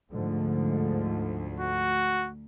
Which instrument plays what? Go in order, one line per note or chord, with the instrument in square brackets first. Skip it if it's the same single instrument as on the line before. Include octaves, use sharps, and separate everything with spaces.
[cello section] D2 [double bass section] G#2 D3 F3
[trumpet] F#4